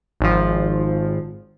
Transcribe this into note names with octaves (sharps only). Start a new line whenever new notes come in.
G#1 F3